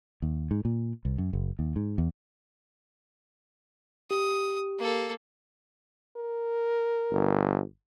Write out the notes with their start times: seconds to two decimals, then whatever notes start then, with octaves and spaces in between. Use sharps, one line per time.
0.22 D#2
0.51 G#2
0.65 A#2
1.05 C2
1.18 F#2
1.33 F#1
1.59 D#2
1.76 G#2
1.98 E2
4.11 G4 D#6
4.79 A#3 A4
6.17 A#4
7.11 G1